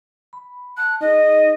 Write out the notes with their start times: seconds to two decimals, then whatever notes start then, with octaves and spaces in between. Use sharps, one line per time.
0.33 B5
0.77 A5 F#6
1.01 D#4 G#4 D#5